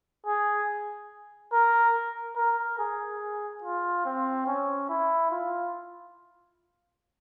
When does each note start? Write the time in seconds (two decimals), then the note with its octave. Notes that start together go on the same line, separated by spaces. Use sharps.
0.26 G#4
1.53 A#4
2.37 A#4
2.79 G#4
3.63 F4
4.05 C4
4.47 C#4
4.89 E4
5.31 F4